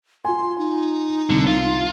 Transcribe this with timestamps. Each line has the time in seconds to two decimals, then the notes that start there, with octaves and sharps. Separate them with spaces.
0.25 F4 G#5 C6
0.58 D#4
1.30 C2 D3
1.47 F4